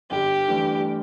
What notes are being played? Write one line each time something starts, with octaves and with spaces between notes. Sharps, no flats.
G1 G4
G2 E3 A3